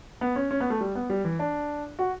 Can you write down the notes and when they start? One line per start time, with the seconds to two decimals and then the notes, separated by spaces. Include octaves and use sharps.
0.21 B3
0.36 C#4
0.51 C#4
0.60 B3
0.70 A3
0.81 G3
0.95 B3
1.10 G3
1.25 E3
1.39 D4
1.99 F#4